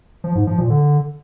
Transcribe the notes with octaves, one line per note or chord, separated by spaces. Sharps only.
F3
G#2
F3
A#2
D3